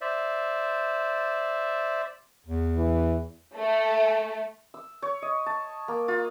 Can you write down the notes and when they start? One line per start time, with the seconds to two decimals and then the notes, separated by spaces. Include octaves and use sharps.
0.01 C5 D5 E5
2.47 E2
2.76 E3
3.56 A3
4.74 E6
5.02 C#5
5.22 D#5
5.46 A5
5.88 A#3
6.08 F4